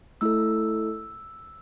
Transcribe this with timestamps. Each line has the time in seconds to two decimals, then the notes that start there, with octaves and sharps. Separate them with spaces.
0.21 A3 E4 A4 E6